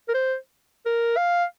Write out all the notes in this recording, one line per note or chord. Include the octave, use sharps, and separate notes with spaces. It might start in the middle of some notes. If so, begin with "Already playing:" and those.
A#4
C5
A#4
F5